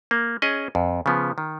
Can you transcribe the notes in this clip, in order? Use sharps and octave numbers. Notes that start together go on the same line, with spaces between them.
A#3
C#4 G#4 D#5
F2
C#3 F3 B3
D#3